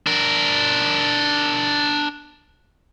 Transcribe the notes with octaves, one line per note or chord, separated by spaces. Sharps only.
D4 A#4